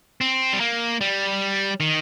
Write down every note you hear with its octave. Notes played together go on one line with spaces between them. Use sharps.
C4
G3
A#3
G3
D#3